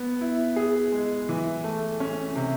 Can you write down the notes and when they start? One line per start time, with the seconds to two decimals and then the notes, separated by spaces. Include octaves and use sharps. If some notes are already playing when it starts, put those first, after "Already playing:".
Already playing: B3
0.21 E4
0.56 G#4
0.92 G#3
1.29 E3
1.64 A3
2.00 C#4
2.35 C3